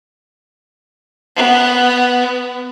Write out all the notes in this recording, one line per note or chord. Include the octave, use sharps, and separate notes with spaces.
B3